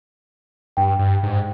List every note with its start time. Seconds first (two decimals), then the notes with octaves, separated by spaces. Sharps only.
0.77 G2 G5
0.99 G2
1.23 G#2